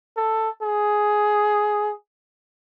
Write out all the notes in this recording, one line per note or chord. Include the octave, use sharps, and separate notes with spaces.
A4
G#4